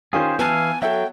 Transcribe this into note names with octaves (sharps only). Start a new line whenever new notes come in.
D#3 C#4 F4 G4 G#4 C5 G5
E3 B3 B4 F5 G#5 A5
F#3 A4 E5 G5